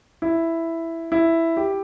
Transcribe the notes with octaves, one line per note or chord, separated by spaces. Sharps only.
E4
E4
G4